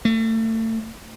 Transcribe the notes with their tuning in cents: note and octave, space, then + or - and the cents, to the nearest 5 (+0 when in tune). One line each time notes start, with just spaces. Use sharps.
A3 +30